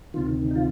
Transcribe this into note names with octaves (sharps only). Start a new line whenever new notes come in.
D2 C3 D#3 F4
D#4
F4